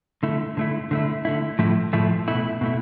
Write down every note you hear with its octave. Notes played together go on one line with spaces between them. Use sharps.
D3 A3 E4
D3 A3 E4
D3 A3 E4
D3 A3 E4
A2 F3 A3 E4
A2 F3 A3 E4
B2 A3 E4
B2 A3 E4